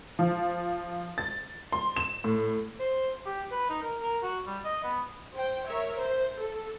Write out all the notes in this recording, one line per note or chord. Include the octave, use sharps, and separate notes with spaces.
F3
A6
C6
E7
A2
C5
G4
B4
D#4
A#4
A#4
F#4
G3
D#5
B3
C5 G5
A#4 C#5 E5
C5
A4